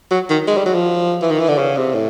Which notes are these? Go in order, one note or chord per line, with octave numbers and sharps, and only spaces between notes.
F#3
D#3
G#3
G3
F#3
F3
E3
D#3
E3
D3
C#3
C3
A2